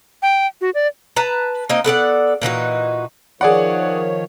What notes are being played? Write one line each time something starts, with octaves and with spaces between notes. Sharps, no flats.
G5
F#4
D5
B4 A5 A#5
A#3 C4 D#4 D#5
B3 A4 D5 F#5
A#2 E3 D#4 F#4
D#3 F3 G#4 C#5 D5 F#5